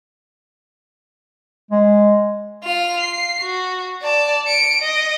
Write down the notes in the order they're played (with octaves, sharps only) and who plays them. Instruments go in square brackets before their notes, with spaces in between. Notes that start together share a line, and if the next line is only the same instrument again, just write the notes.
[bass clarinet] G#3
[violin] F4 F7
C7
F#4
D5 A5
C#7 D7
D#5